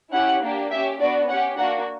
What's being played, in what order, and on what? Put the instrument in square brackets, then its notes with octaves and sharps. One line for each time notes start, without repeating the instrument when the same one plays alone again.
[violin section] C#4 E4 G4 F#5
A#3 D4 G4
G4 E5
C#4
B3 D4 F#4 D5
C#4 F#5
G4
A#3 D4 F#4 F#5